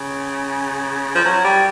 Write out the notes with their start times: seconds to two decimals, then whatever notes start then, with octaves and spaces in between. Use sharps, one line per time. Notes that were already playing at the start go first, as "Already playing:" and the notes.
Already playing: C#3
1.15 F3
1.25 F#3
1.44 G3